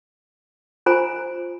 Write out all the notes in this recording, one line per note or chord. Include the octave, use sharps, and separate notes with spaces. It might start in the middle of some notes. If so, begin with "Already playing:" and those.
F4 C5 G#5 A#5